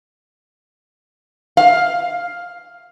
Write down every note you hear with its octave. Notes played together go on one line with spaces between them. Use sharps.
F5